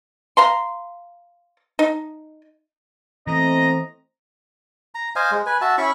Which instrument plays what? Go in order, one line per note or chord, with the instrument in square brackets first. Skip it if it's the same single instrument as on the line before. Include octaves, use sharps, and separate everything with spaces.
[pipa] F5 A#5 C6
D#4
[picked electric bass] E3 [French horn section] A3 B3 C4 [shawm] D#5 [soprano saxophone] A#5
[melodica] A#5
C5 D#5 F5 G#5
G#3
B4 G#5
F#4 E5 A5
C#4 E4 B5 C#6